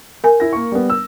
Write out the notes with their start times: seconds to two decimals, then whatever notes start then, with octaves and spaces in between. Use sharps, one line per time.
0.24 A#4 G#5
0.40 E4 A#6
0.53 A#3 C#6
0.72 G3 B3
0.90 E6